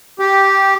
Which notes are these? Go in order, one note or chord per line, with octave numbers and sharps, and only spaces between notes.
G4